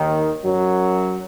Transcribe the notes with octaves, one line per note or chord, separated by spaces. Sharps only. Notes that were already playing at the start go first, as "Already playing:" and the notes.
Already playing: D#2 D#3
F#2 F#3